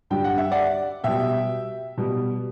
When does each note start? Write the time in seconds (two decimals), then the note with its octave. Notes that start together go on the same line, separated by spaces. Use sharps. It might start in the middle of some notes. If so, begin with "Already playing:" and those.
0.10 G2 D3 G3 G5
0.24 F#5
0.38 E5
0.51 D5 F#5
1.04 B2 G3 E5 G5
1.98 B2 G3